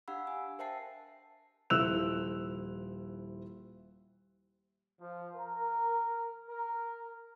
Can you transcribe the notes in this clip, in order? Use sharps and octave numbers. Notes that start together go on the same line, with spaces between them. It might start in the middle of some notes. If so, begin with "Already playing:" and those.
D4 G4 F5 F#5 B5 E6
G#5
A#4 C5 E5 G5 A5 C7
D#1 F3 E4 E6 F#6 F7
F3
A#4
A#4